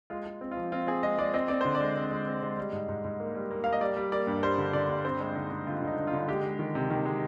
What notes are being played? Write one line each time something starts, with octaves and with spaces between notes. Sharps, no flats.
G#3 F4
G#3
C4
F4
F3
C4 F4
C4 G#4
G#3 D#5
G#3 D5
C4 D#5
C4 D5
D3 C5
D5
G#3
C4
G#3
C4
G#3
G3
G#2
G#2
G#2
A#3
G3
A#3
A#3 F5
D#5
G3 D5
G3
A#3 D5
G2
G3 C5
D3
D3 D5
G2
C4 C5
G#3
D3 D#4
D3
D3 F4
D3
D#4
D3
F4
D3
G#3 G4
G#3
D#3
C3
D#3
G#3